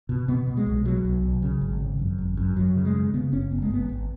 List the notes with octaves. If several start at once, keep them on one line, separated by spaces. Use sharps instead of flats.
B2
B2 B3
B2
G#3
B1
B2 F#3
B1
B1
C#3
G#1
C#3
F#2
G#1
F#2
F#2 F#3
C#3
G#3
C#3
C#3 B3
F#1 C#4
F#1 B3
G#3
G#1 B3
G#1